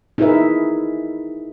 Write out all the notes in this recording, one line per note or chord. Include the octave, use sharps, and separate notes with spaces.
D#4 E4 G#4 A#4 B4 E5